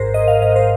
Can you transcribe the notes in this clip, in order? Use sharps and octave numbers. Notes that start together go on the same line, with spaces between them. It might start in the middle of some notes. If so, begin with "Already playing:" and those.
Already playing: G#1 G#2 A#4 C5
G#2 D#5
F5
G#2 D#5
C5